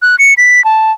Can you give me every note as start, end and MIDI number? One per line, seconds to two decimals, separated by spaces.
0.02 0.16 90
0.19 0.34 97
0.38 0.63 95
0.65 0.92 81